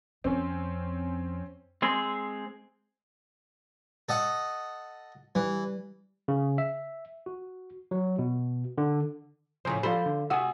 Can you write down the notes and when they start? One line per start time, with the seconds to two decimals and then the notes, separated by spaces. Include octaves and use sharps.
0.24 F2 C4 C#4
1.82 G#3 C4 G#4
4.09 A4 D#5 F#5
5.35 E3 G3
6.28 C#3
6.58 E5
7.26 F#4
7.91 F#3
8.19 B2
8.78 D3
9.65 A2 C#3 F3 C5 G#5 A#5
9.83 F3 A4 C5 D5 F5 B5
10.06 D3
10.30 C3 F#4 F#5 G#5 D#6 E6